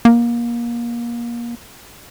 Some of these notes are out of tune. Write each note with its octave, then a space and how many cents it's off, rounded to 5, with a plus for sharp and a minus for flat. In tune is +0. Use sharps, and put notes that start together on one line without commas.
A#3 +25